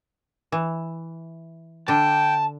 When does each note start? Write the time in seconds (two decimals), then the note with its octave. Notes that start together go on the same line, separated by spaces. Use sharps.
0.52 E3
1.88 D3 D4 G5 A5